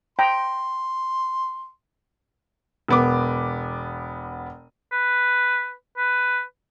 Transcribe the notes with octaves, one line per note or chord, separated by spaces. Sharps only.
G5 A#5 C6
E1 B3 D6
B4
B4